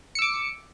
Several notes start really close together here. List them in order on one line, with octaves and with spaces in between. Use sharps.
C#7 E6 D6